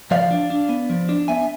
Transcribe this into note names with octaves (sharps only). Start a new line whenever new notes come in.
F3 D5 F5
D4
D4
B3
F3
D4
B3 E5 G#5